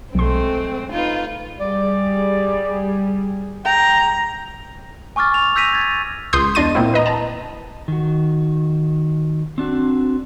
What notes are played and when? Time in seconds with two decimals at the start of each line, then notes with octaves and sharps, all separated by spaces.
0.15 B1 G#3 A3 C4 C6
0.92 D#4 F4 B4
1.60 G3 G#4 D5
3.65 G5 A#5
5.16 G#5 C#6 D6 F6 A6
5.34 F7
5.56 E6 G6 A#6 B6 D#7 F7
5.73 G#6 A6
6.33 C#2 C6 D#6 G6
6.55 E2 D4 D#5 C6 A6 D#7
6.75 A#2 A#3 C4 E4
6.94 B4 D#5 A#5
7.06 A5 A#5
7.88 D#3 F#4
9.58 C4 D4 F#4